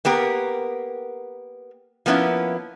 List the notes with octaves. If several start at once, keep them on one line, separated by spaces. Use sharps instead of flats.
A#3 B3 G4 A#4
F3 A#3 B3 C#4 E4